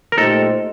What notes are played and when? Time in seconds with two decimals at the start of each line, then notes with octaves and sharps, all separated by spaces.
0.12 A#4
0.17 A#2 A3 D#4 G4 A4 C5